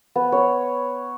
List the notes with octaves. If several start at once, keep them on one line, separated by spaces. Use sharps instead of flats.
B3
C#5